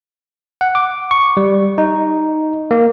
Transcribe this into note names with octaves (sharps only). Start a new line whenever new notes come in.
F#5
D6
C#6
G3
D#4
A#3